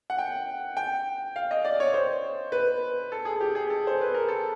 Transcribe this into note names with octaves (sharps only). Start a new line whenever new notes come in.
F#5
G5
G5
F5
D#5
D5
C#5
C5
B4
A4
G#4
G4
G#4
A4
C5
B4
A#4
A4